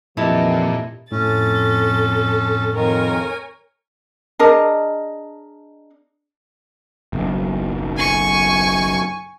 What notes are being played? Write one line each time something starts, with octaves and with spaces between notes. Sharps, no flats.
F2 A#2 D#3 E3 E4 G4 D#5 A5
F2 A2 C#4 A4 A6
F2 D#3 A#4 C#5 G#5
D4 G#4 A#4 D#5
F#1 B1
G#5 C#6